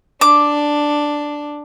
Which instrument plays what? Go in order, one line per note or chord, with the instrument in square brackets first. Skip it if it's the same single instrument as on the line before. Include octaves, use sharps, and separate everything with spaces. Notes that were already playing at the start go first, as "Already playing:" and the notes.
[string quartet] D4 [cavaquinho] D6